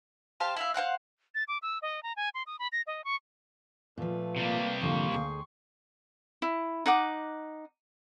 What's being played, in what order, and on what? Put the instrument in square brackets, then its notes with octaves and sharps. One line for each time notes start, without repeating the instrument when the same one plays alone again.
[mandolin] G4 C5 F5 A5
E4 E5 F5
C5 F5 F#5 F#6
[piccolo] A6
D6
E6
D#5
A#5
G#5
C6
D#6
B5
A#6
D#5
C#6
[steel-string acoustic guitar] A#2 F3 [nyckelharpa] A3 B4
[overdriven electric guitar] C3 G3 [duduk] A#3
[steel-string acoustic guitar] G#2 D3 F3 [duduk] A#3 [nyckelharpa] C6 C#6
[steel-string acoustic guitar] D2 G#4 G5
[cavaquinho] E4
D#4 F#5 D6